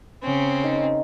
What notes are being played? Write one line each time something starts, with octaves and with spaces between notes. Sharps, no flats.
C#3 C4 C#4
D#3